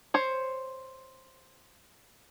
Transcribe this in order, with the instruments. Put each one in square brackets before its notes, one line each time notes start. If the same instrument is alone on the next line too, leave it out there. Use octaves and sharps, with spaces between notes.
[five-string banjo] C5 C#5